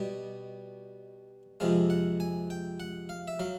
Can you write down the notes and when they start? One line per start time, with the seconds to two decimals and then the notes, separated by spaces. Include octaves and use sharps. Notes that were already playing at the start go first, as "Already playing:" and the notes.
Already playing: B2 G3 D#5
1.60 F2 C3 F3 G#3 F5
1.90 F#5
2.20 G#5
2.50 G5
2.80 F#5
3.09 F5
3.28 E5
3.40 F#3 F5